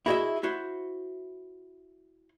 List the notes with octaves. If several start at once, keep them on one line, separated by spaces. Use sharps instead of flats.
E4 F#4 G#4 C#5 D#5 E5
E4 F#4 C5